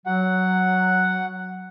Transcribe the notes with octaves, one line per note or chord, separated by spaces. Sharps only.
F#3 F#5